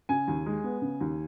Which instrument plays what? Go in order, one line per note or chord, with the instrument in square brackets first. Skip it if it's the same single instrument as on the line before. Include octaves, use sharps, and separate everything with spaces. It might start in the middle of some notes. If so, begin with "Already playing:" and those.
[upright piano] C#3 G#5
D#2
G#3
B3
C#3
D#2